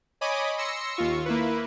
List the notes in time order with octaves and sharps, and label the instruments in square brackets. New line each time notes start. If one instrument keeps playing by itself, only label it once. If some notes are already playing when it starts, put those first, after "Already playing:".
[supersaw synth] C#5 D#5 G#5 B5 D6 D#6
C6 E6 A#6 C#7
D#2 F4 C#6
A#3 E4 B4